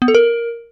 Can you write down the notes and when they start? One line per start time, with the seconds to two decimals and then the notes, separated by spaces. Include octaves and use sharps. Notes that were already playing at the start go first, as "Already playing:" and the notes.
0.02 B3
0.08 A4
0.15 A#4